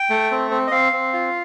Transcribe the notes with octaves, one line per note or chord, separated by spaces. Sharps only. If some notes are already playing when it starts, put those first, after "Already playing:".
Already playing: G5
A3
C4
C4
D#5
C4 F5
C4
F4